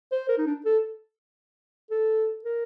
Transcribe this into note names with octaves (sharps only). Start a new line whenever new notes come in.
C5
A#4
D#4
D4
A4
A4
A#4